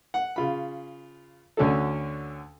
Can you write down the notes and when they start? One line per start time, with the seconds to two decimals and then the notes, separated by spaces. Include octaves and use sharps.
0.14 F#5
0.36 C#3 F4 B5
1.57 D2 D3 C#4 F#4 A4